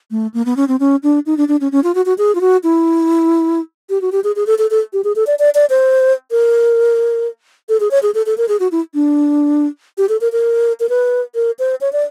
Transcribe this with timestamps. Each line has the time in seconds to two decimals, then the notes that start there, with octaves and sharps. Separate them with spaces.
0.11 A3
0.34 A#3
0.46 B3
0.57 C#4
0.68 C4
0.80 C#4
1.03 D4
1.26 D#4
1.37 D4
1.48 D4
1.61 C#4
1.72 C#4
1.84 F4
1.95 F#4
2.06 F#4
2.18 G#4
2.35 F4
2.41 F#4
2.64 E4
3.90 G4
4.02 F#4
4.12 G4
4.24 G#4
4.36 G#4
4.47 A4
4.58 A4
4.71 A4
4.93 G4
5.04 G#4
5.16 A4
5.27 D5
5.39 D5
5.55 D5
5.70 C5
6.31 A#4
7.69 A4
7.80 G#4
7.91 C#5
8.03 G#4
8.15 A4
8.26 A4
8.38 A#4
8.49 G#4
8.60 F#4
8.72 E4
8.94 D4
9.98 G4
10.09 A4
10.21 A#4
10.32 A#4
10.80 A#4
10.89 B4
11.35 A#4
11.59 C5
11.81 C#5
11.93 D5